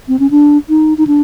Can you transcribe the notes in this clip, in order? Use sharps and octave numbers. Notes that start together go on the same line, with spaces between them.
C4
C#4
D4
D#4
D#4
D4